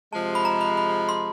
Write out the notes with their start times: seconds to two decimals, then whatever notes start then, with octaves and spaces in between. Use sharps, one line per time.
0.13 C3 F3 G#3 A5
0.35 B5
0.45 A#5
0.61 B5
0.77 B5
1.09 C6